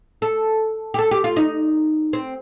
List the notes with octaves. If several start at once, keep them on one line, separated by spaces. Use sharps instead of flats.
A4
G4
A4
G4
F4
D#4
C4